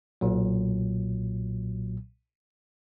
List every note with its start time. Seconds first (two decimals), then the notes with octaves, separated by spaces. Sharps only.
0.21 B1 A#2 F#3